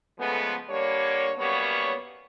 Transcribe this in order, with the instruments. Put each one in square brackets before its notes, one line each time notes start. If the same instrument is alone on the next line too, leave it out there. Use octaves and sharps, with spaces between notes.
[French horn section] C#3 F3 G#3 A3 B3
D3 G3 A#3 C#5
F#2 G3 A#3 B3 C#5